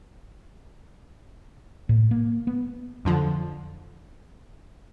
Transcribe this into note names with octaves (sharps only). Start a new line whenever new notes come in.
A2
A#3
B3
F2 D3 F3